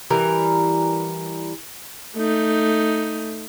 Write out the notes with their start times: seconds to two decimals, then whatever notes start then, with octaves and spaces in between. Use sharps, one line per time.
0.10 E3 G3 A#4
2.16 A3 D#4